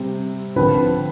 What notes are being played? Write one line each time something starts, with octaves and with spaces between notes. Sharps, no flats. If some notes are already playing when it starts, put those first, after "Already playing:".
Already playing: C3 G3 C4
D3 F3 C4 B4